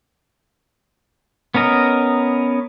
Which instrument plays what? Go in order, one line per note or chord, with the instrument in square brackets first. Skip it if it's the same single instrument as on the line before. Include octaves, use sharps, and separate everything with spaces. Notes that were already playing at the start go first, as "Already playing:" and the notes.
[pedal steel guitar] B3 C#4 A#4 D#5